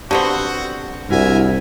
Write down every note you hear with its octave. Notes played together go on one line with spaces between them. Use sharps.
D3 B3 C4 F#4 G4
C2 D4 E4 F#4 A#4 E5 G#5